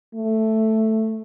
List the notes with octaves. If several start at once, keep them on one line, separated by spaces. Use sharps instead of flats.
A3